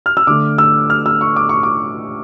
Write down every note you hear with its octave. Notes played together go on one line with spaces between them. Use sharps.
F6
E6
D3 A3 D6
E6
F6
E6
C#6
D6
C#6
D6